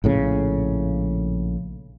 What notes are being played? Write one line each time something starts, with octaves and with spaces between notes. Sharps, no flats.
A#1 A2 C#3